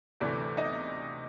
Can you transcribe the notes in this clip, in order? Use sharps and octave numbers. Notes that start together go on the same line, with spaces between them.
D2 C3 E3 A3 D5
D#4 D#5